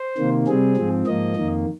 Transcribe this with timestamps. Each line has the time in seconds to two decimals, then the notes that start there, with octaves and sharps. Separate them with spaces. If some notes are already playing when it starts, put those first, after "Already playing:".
Already playing: C5
0.18 C3 D#3 A#3
0.47 C3 G3 C4 G#4
0.77 G#2 F3 C4
1.06 G#2 F3 A#3 D#5
1.36 F2 D#3 A#3